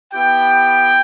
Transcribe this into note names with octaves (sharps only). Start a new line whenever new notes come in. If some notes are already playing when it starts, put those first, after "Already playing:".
B3 E4 G4 G5